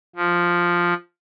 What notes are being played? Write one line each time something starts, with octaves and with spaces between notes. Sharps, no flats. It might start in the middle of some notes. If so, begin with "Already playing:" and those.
F3